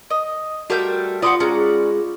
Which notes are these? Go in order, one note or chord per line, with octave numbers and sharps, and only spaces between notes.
D#5
G3 A3 F#4 A#4 G5
F4 B4 D5 F#5 C6 D#6
G#3 C#4 D5 A#5